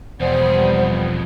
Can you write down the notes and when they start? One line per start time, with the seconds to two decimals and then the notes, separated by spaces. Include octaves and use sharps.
0.20 E1 F2 G3 B3 G#4 C5